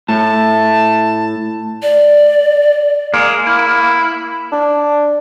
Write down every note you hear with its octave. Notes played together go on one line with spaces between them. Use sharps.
A2 A5
D5
G#3 A#3
E4
D4